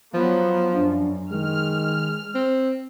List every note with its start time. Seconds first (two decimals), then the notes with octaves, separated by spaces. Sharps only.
0.14 F3 F#3 B3
0.74 F#2 D4
1.32 D#3 G#3 F6
2.35 C4